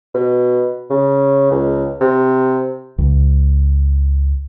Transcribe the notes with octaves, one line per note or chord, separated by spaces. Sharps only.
B2
C#3
C#2
C3
C#2